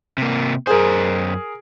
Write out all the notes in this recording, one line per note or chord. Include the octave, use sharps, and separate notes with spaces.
C3 A#3
F#2 G#4 A#4 C5